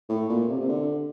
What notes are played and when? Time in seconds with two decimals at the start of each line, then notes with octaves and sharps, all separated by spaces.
0.09 A2
0.29 A#2
0.49 C3
0.60 C3
0.68 D3